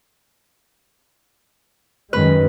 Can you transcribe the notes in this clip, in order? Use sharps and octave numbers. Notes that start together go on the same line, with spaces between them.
F#2 D#3 G#3 B4